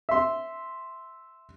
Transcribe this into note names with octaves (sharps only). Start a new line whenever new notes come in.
E5 C6